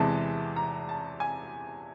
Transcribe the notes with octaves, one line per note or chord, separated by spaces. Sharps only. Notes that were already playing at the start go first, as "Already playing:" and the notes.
Already playing: E2 C3 E3 G#3 A5
A#5
A5
G#5